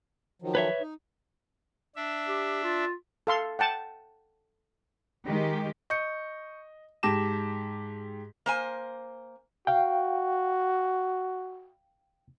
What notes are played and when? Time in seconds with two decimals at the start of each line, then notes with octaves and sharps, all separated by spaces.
0.42 D#3 F3 F#3
0.55 B4 C#5 E5
0.81 D#4
1.96 D4 E5
2.28 G4
2.64 F4
3.27 A4 F5 C6
3.59 F#5 G5 A5
5.27 D#3 G#3 G4
5.90 D#5 C#6 G6 C#7
7.03 G#2 G4 A5 D6 A#6 E7
8.46 A#3 C5 G#5
9.67 F#4 F5 G5